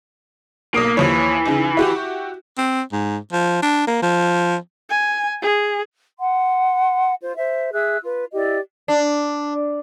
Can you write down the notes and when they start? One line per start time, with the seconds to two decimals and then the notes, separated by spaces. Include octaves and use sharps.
0.74 B1 A#3 D#6 D7
0.97 D#2 E3 F3 C#5
1.45 C#3 D#4
1.77 E4 F#4 G4
2.58 C4
2.93 G#2
3.33 F3
3.62 D4
3.87 A#3
4.03 F3
4.90 G#5
5.42 G#4
6.19 F#5 C6
7.21 F4 C5
7.37 C5 E5
7.72 G#4 E5 E6 F#6
8.03 F4 B4
8.33 E4 G4 D5 D#5
8.88 D4